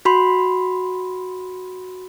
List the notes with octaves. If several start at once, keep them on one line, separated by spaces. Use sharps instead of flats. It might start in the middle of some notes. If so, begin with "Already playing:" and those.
F#4 B5 C6